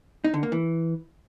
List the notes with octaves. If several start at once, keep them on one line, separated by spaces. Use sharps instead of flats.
D#4
D3
A#3
E3